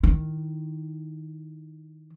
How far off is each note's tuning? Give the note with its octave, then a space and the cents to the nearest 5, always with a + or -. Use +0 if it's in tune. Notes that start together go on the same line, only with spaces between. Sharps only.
D#3 +0 E4 +0